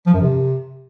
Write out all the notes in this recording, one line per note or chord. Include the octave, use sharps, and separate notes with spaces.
F3
F#2
C3